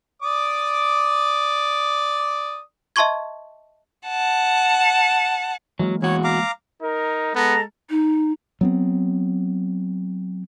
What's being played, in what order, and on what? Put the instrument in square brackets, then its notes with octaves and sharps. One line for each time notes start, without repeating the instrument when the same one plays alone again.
[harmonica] D5 D6 D#6
[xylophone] D#5 E5 A5 C6 C#6 G#6
[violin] F#5 A5
[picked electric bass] E3 G#3 A#3 [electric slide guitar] F#3
[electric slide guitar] E2 F#4 [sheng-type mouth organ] C#5
[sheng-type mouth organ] F5 A#5 D6
[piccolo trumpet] D#4 [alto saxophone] A#4
[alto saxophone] G#3 [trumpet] B3 [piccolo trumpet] A4 [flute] A#5
[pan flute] D#4
[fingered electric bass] F#3 B3 C4